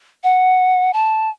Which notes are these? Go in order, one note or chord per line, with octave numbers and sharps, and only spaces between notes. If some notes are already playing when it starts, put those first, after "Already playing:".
F#5
A5